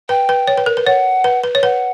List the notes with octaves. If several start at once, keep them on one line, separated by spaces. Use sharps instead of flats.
B4 G5
B4
C#5
B4
A#4
B4
C#5 F#5
B4
B4
C#5
B4 F#5